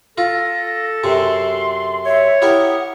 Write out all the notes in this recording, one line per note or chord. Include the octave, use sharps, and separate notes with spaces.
F4 A4 A#6
F#2 C3 C6
C#5 E5
E4 G4 A#4 F#5 D#6